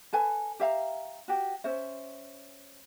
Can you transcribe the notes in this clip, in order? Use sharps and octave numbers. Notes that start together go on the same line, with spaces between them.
A4 B4 G#5
G4 E5 F5 A#5
F#4 G4
C#4 C5 E5